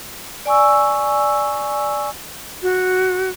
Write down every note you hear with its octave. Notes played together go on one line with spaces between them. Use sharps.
D5 G#5 C#6 E6
F#4